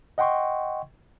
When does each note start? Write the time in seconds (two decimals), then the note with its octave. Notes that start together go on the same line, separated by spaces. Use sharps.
0.18 D#5 F#5 G5 C6 C#6